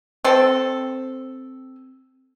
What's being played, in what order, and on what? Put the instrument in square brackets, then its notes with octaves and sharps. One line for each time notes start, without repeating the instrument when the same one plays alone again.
[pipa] C4 A4